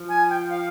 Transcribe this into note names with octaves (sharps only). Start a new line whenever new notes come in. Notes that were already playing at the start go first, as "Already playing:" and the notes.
Already playing: F3
G#5
G5
F5